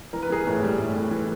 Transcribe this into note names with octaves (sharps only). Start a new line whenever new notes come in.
E3 A#4
B4
E3 G#4 A#4
A2
G3
A2
A2
E3